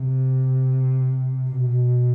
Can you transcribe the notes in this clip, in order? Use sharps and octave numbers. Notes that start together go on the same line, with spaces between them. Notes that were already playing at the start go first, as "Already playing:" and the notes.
Already playing: C3
B2